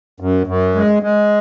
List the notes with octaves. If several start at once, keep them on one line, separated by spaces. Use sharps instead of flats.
F#2
F#2
G#3
G#3